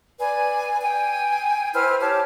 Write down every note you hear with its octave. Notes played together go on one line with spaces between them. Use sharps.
B4 D5 G#5
G5 G#5
E4 B4 C5 F6
G4 C#5 A5